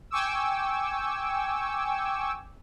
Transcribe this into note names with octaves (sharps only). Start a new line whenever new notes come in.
G5 G#5 C#6 D6 E6